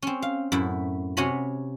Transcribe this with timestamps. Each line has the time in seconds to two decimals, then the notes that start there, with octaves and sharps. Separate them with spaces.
0.02 C4 C#4
0.22 F5
0.52 F#2 A2 E4 E5
1.17 C3 C#4 F#4 C#5 G#5 B5